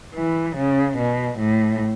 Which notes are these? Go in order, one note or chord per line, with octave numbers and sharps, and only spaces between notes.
E3
C#3
B2
A2